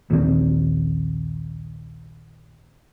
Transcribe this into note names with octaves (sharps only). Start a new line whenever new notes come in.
A#1 D#2 D#3 C4